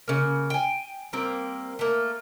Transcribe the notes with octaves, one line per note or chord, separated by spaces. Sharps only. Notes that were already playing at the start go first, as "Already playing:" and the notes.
C#3 A#3
G5 G#5
G3 A#3 C4
A3 A#3